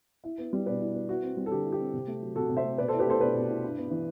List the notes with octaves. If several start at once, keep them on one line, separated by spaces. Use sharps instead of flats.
E4
B3
G3
B2 B4 D5
E4
B3
E4 F#4
C4
G3
A4
D3 G4
E4
G4
C4
C3
A3
F#3
C3 F#4 A4
C3
C5 E5
A3
B2 B4 D5
A4 C5
E4
G4 B4
A3 A4 C5
B2 B4 D5
B2
E4
G2
B3
E3